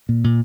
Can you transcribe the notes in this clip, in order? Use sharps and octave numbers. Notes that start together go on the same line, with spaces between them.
A#2
A#2